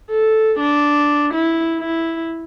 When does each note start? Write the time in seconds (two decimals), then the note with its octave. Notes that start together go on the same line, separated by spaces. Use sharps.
0.11 A4
0.59 D4
1.34 E4
1.80 E4